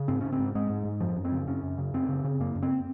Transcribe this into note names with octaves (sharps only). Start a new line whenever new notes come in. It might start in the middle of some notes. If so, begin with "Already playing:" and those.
Already playing: C#3
G#2 C4
G#2 C#4
C4
G#2
G#2 G#3
G#2
G#2
F#2 F3
F#2
C4
C#3
F#2 C#4
F#2
C#3
F#2 C4
C#3
C#3
F#2 A#3
F#2
C4